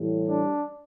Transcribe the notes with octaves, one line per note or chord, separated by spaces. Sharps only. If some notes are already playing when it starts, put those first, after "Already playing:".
Already playing: A2 E3 G3
D4